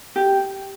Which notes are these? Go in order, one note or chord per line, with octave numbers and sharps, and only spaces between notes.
G4